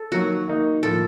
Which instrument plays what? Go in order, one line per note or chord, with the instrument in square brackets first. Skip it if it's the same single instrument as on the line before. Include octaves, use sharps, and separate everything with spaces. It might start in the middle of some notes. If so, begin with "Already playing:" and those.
Already playing: [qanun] A4
[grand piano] D#3 F#3 A#3 [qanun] F#4
[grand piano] D#3 A#3 D#4
[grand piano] A2 F3 A#3 [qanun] A4